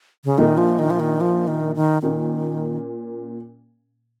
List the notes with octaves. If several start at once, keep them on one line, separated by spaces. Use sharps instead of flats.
C#3
A#1 A#2 D#3 A#3 D#4
F3
D#3
F3
D#3
F3
D#3
D#3
A#2 D#3 A#3 C#4